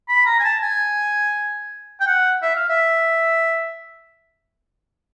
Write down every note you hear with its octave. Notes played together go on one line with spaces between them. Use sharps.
B5
A#5
G#5
A5
G#5
G5
F#5
E5
F5
E5